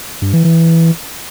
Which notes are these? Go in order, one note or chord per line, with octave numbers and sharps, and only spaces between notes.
G2
E3
E3